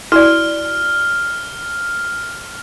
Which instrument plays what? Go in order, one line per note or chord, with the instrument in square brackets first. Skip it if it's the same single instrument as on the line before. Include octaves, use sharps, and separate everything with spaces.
[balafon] E4 [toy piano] F#4 D5 [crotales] F6